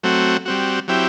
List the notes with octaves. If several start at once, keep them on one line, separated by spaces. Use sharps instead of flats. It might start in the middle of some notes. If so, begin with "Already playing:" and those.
F#3 A3 C4 F#4
G3 C4 F#4
F#3 C4 E4 G4